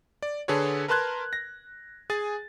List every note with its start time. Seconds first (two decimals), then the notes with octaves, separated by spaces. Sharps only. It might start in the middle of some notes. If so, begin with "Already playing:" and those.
0.23 D5
0.48 D3 G#4 A4 B4 C#5
0.88 A#4 B4 A5 C6 F#6 G#6
1.33 A#6
2.10 G#4 G#5 A6